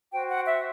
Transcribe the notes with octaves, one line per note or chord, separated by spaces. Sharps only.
F#4 C5 G5
F#5
E5